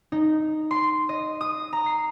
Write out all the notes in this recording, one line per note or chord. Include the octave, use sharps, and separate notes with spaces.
D#4
C6
D#5
D#6
A#5
C7